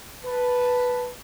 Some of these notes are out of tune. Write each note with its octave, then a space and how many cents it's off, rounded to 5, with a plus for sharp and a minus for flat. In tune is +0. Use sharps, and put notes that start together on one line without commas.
B4 +0 A5 +0